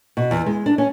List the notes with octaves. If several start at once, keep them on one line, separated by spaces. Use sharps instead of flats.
B2
E2
G#3
D4
C#4